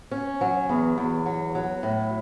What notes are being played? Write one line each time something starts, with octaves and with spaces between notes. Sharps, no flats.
C#4
F#3
E2
E2
F#3
F#3
A2